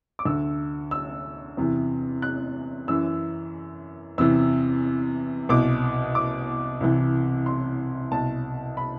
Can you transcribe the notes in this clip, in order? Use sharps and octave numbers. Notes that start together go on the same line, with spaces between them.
D6
D2 D3 E6
E6
E2 C3 E3
F#6
F#2 E3 E6
E2 C3 E3 E6
C2 B2 D6
D6
C2 C3 E3
C6
C2 B2 A5
B5